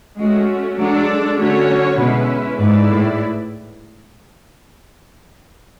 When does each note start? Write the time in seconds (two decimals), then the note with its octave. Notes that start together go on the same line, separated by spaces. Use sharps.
0.18 G#3 A3 C#4 F#4
0.78 F#3 G#3 D4 A4 D5
1.39 D3 F#3 A3 C#4 F#4 C#5
1.99 B2 G#3 C#4 E4 B4
2.60 G#2 A3 E4 G#4 B4 D5
2.90 A2